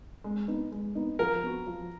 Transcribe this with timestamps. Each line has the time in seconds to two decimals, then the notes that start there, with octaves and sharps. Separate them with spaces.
0.24 G#3
0.48 B3 D#4
0.72 G#3
0.95 B3 D#4
1.19 F3 A#4
1.43 B3 F#4
1.67 F3